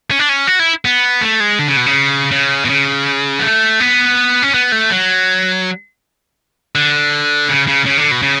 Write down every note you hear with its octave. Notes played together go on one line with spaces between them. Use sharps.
C#4
D4
C#4
F#4
E4
B3
A3
G#3
D3
C#3
B2
C#3
C#3
B2
C#3
B3
A3
B3
C#4
B3
A3
F#3
D3
C#3
C#3
C#3
D3
B2
C#3